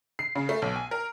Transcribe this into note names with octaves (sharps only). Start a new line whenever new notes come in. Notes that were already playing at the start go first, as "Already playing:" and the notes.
C7
C#3
A3
B1
G#5
A#4